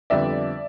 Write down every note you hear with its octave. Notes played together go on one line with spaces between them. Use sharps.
F2 D3 G3 B3 D5 E5